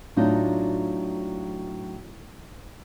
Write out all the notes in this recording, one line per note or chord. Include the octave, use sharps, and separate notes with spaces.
A2 F#3 D4 D#4 F4